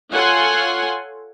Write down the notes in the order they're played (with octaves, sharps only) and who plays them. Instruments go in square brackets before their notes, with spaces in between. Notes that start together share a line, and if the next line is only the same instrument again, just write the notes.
[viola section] F4 A4 C#5 F#5 G#5 C6